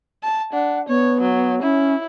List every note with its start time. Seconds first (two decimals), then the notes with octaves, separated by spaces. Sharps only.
0.23 A5
0.53 D4 F#5
0.88 B3 C#5
1.21 F#3
1.63 C#4 E4